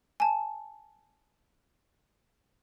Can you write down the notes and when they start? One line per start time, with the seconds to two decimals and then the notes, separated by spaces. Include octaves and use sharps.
0.20 G#5 A5